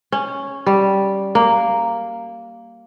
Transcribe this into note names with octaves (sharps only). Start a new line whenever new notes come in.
C#4
G3
A#3